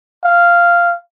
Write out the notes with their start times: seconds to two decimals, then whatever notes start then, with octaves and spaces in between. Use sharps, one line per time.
0.24 F5